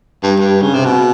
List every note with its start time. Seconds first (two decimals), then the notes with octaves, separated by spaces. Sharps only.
0.23 G2
0.39 G2
0.62 C#3
0.74 C3
0.86 B2